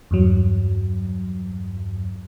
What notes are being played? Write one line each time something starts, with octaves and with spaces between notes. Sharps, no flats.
E2 G2 F#3